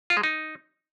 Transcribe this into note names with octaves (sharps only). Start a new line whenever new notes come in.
F4
G#3
D#4